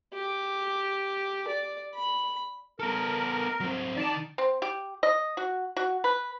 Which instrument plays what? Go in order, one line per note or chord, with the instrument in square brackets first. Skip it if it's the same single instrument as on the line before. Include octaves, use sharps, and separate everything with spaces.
[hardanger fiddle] G4
D5
B5
[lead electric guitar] B3 A4 [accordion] A#4
[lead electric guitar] F#3 C4
[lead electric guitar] D#3 [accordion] D5 A5
[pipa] C4
G4
D#5
F#4
F#4
B4